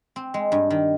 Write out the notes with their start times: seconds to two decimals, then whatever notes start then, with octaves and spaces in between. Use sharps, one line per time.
0.16 C4
0.34 G#3
0.52 G2
0.70 D#3